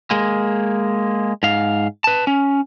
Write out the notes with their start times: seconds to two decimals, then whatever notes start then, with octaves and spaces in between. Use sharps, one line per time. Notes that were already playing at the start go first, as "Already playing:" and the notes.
0.11 G#3 A#3
1.43 G#2 F5
2.04 B4 A5
2.27 C#4